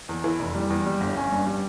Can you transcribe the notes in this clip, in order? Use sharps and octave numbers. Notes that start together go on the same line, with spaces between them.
E2
E3
F1
G3
E2
G3
G1
C#4
G2
G3